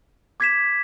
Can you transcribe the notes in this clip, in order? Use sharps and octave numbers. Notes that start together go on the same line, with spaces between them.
D6 G#6 B6 E7